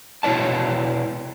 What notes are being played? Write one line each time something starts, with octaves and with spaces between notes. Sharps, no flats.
B2 E4 C#5 D5 A5